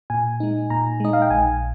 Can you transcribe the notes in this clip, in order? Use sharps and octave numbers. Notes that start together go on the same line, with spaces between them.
A#2 G#5
G#3 D#4
A#2 A#5
G#3 D#4 D#5
F5
G5
A#1 G#5